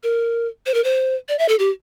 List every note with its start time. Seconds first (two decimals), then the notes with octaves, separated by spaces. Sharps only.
0.03 A#4
0.66 C5
0.74 A#4
0.84 C5
1.29 D5
1.39 E5
1.49 A4
1.59 G4